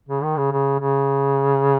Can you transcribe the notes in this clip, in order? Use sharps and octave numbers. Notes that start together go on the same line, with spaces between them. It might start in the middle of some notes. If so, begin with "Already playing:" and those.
C#3
D#3
C#3
C#3
C#3